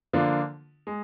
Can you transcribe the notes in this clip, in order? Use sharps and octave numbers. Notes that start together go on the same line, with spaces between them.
D3 F3 A#3 D4 F4
G#3